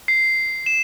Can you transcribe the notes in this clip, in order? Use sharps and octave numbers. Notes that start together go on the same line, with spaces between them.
C7
E7